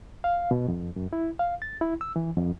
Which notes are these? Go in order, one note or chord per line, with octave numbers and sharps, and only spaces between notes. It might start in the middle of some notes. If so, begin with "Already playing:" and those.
F5
B2
F2
F#2
E4
F5
A6
E4
E6
E3
F2